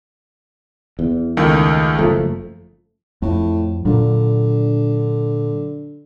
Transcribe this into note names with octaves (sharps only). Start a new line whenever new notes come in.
E2
C#2 D#3 A3
F#1 F3 A3
F2 A2
A#2 D3 F#3